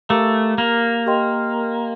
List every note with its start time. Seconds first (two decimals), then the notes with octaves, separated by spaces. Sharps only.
0.09 A3 G4 A#4 F5 A#5 D6
0.58 A#3
1.06 G4 A#4 D#5 G5 C6